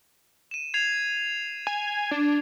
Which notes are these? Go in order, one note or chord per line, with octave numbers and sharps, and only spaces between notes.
D#7 E7
G#6 C7 F7
G#5
D4